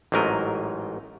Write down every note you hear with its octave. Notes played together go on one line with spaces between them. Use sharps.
A1 G#2 F#3 A3 A#4 D#5